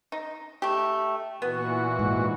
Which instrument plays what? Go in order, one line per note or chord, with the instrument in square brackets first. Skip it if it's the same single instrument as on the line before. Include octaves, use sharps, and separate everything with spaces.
[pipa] D#4
A3 G4
[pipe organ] A#2 E3 F#4 [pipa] B3
[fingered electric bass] G#2